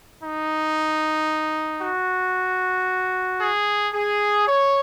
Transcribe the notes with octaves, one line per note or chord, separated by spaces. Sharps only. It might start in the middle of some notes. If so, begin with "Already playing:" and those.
D#4
F#4
G#4
G#4
C#5